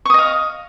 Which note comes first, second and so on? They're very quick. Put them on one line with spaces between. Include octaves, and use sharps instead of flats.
C#6 D#6 D#5 F5